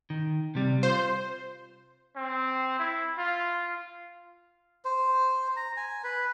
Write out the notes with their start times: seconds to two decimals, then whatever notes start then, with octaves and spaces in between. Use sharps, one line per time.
0.10 D#3
0.55 C3 G3
0.83 F4 C5
2.16 C4
2.79 E4
3.18 F4
4.85 C5
5.56 A#5
5.77 G#5
6.04 B4